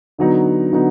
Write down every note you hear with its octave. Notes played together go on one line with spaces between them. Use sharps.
D3 F#3 B3 D#4
D3 F#3 B3 D#4